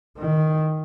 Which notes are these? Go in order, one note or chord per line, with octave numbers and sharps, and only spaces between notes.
D#3